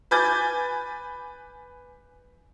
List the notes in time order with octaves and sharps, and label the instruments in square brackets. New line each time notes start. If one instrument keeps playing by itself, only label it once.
[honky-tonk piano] B4 G#5 D6 G6 A6